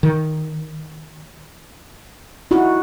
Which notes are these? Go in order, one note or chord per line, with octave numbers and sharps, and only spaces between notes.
D#3
D#4 E4 F#4